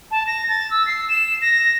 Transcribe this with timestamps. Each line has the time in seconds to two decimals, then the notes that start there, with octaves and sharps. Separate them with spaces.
0.11 A5
0.27 A#6
0.49 A6
0.71 E6
0.87 C7
1.09 E7
1.42 A#6